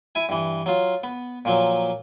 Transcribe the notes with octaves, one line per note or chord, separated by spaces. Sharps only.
E4 G#5
G2 E3
F#3 F4
B3
A#2 F3 F#3